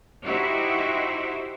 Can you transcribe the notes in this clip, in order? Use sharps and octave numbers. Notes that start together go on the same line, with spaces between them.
D#4 E4 F#4 G4 C5 E5